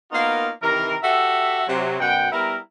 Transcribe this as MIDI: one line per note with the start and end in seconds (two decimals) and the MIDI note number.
0.11 0.48 58
0.11 0.48 59
0.11 0.48 63
0.11 0.48 65
0.11 0.48 66
0.11 0.48 70
0.62 0.94 48
0.62 0.94 51
0.62 0.94 52
0.62 0.94 70
1.02 1.62 66
1.02 1.62 67
1.02 1.62 69
1.02 1.62 76
1.67 1.99 48
1.67 1.99 54
1.99 2.27 42
1.99 2.27 47
1.99 2.27 78
1.99 2.27 79
2.31 2.56 55
2.31 2.56 59
2.31 2.56 64
2.31 2.56 70